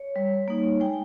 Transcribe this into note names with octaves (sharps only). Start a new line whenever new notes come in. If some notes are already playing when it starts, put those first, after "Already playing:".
Already playing: C#5
G3
A#3 D#4
G#3 G5